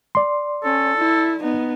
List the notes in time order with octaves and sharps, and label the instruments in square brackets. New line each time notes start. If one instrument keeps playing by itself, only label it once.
[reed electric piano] D5 C6
[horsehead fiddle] C#4 [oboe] A4
[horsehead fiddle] E4
B3 D#4